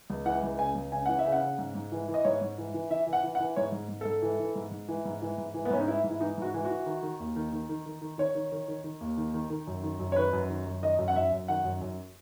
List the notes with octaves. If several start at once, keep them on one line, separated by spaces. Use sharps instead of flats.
C#2
E3 F#5
C#2
C#3 G#5
C#2
C#3 G#5
E3 F#5
E5
C#3
F#5
C#3
G#2
G#2
E3
E3
D#5
G#2 C#5
G#2
E3
E3
E3 E5
E3
F#5
E3
F#5
E3
G#2 C#5
G#2
G#2
G#2 A4
E3
E3
G#2
G#2
E3
G#2
E3
G#2
E3
B3
G#2 C#4
D#4
E3 E4
G#2
E4
E3 D#4
G#2 F#4
E3
F#4
E3
D#3
D#3
D#2
D#3
D#3
D#3
D#3
D#3
D#3 C#5
D#3
D#3
D#3
D#3
D#2
D#3
D#3
D#3
F#2
D#3
F#2
C#5
D#3 B4
F#2
D#3
F#2
D#3 D#5
F#2
F#5
F#2 E5
F#2
D#3 F#5
F#2
F#2